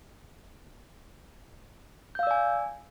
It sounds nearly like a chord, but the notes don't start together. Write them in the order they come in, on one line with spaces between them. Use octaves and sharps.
G6 F5 E6 D5 G#5